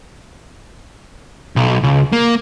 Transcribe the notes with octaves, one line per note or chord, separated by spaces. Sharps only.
B1
C#2
A#3